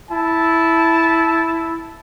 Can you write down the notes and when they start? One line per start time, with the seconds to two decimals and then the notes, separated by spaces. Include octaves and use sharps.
0.10 E4 A5